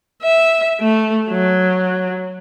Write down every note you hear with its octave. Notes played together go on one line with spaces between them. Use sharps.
E5
A3
F#3